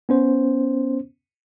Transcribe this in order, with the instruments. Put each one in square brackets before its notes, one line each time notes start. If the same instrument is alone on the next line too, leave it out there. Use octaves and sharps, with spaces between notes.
[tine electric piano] B3 C#4 C5